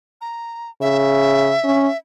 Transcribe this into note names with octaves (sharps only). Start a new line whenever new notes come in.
A#5
C#3 E5
C#4